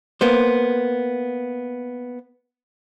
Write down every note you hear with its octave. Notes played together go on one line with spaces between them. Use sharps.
A#3 B3 C5